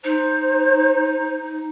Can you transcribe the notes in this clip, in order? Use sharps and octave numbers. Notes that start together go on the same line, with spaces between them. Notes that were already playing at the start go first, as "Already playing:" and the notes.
D#4 C5